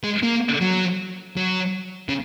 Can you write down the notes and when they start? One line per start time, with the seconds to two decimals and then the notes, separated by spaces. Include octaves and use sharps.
0.04 G#3
0.23 A#3
0.61 F#3
1.37 F#3
2.09 C#3